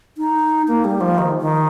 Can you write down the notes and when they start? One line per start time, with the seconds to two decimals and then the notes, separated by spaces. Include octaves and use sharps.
0.18 D#4
0.68 A#3
0.85 G3
1.01 F3
1.18 D#3
1.41 D#3